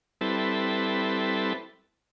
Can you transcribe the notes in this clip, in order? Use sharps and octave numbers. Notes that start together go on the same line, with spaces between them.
G3 C4 E4 A4 B4